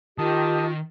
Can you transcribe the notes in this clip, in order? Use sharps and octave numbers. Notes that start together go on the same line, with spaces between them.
D#3 F4 G4 A#4 D#5 A5 D#6